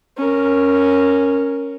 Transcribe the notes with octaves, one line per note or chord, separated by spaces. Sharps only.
C#4 A#4